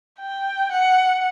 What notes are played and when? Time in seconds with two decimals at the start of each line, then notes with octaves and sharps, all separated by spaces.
0.19 G5
0.71 F#5